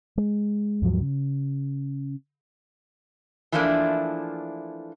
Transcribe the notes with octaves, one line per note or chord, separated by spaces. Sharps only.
G#3
D#2 G#2 F3 F#3
C#3
E3 F3 A3 A#3 D4 E4